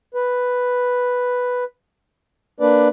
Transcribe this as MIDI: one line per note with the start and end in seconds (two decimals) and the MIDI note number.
0.14 1.64 71
2.60 2.88 58
2.60 2.88 62
2.60 2.88 71
2.60 2.88 74